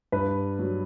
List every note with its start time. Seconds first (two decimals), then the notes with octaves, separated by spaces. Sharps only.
0.12 G2 B4
0.59 F#3